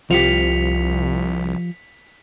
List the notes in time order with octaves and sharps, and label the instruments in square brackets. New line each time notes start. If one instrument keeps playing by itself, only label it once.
[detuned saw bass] C2 [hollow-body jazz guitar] F3 F4 G4 [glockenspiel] B6 C#7 F7